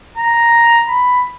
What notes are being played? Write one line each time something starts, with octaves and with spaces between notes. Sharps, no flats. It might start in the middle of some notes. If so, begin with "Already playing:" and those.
A#5
B5